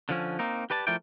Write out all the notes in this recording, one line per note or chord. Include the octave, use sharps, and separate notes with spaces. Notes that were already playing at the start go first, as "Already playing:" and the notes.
D3 F3 C#4
A#3 C4 D#4
G4 B4 D5 A5
F3 A3 E4 A#4 D5 G5